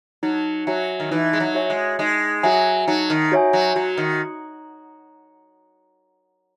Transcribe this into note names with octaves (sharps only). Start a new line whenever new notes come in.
F#3 D#4
F#3 F#4 C#5 E5 G#5
D#3
E3 D#4
G#3
F#3
F#4 C#5 E5 G#5
G#3
G#3 D#4
F#3 F#4 C#5 E5 G#5
F#3 D#4
D#3
F#4 C#5 E5 G#5
F#3
F#3 F#4
D#3